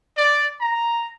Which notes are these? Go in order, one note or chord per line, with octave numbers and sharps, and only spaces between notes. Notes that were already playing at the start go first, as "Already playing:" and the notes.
D5
A#5